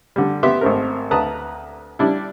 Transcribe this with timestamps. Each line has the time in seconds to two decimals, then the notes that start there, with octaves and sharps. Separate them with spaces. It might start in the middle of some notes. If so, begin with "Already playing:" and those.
0.16 D3 G3
0.43 B3 G4 E5 C6
0.61 G#1 A3 C4 A#4
1.11 D2 B4 A5 A#5 D#6
1.99 G3 D4 E4